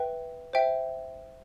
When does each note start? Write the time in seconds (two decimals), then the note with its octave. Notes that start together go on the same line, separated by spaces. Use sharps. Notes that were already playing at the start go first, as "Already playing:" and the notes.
Already playing: B4 E5 G5
0.53 C5 E5 G5